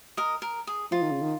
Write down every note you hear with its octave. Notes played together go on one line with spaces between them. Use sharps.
A#4 D#5
A#4
G#4
F3 F4
D#3
C#3
D#3